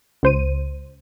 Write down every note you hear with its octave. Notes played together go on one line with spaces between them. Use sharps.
C#2 C5 D#7